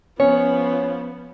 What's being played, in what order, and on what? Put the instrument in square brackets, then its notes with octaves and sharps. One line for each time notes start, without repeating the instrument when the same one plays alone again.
[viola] F3 B3 [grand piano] C#4 [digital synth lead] C#5